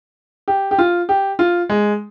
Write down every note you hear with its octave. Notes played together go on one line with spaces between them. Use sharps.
G4
G4
F4
G4
F4
G#3